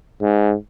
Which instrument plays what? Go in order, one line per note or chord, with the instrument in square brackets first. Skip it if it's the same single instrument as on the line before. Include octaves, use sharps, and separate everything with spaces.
[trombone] G#2